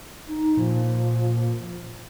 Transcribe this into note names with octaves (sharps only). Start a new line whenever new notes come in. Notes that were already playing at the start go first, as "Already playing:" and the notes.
D#4
A#2 F3